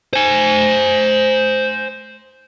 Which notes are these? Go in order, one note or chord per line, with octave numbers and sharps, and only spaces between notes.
C5 G#5